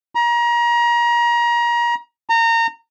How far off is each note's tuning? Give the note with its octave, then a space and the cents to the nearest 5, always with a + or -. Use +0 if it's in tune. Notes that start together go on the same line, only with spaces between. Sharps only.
A#5 +30
A#5 -25